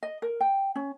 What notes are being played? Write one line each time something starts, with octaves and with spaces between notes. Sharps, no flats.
D#5
A#4
G5
C#4